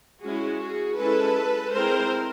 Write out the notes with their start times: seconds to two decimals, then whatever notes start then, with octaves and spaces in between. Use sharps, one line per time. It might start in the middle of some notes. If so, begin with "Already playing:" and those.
0.22 G#3 C#4 E4 F#4 G#4
0.60 F#4 G#4
0.98 G#3 C#4 E4 A4 B4
1.73 G#3 C4 E4 A#4 C5